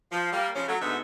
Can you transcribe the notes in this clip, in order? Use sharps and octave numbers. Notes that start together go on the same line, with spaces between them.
F3
G3 A#3
C#3 F3 C#4
F#3 A3
D2 G#2 D3 B3 D#4 E5